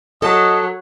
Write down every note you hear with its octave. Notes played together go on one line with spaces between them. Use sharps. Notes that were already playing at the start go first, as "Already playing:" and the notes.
F#3 A4 D#5 A5